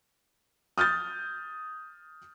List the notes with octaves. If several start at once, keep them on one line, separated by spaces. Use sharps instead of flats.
D#6 F6 G6 A6